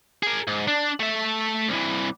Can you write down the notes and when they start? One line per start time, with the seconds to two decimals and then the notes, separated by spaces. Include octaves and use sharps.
0.23 G#4 A#4
0.47 G#2
0.68 D4
1.00 A3 E5
1.69 C2 E3